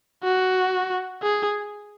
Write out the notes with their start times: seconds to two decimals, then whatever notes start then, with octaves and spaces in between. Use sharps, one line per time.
0.24 F#4
1.23 G#4